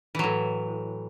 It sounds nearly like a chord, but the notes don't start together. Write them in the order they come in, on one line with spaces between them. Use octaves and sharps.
E3 F#3 A2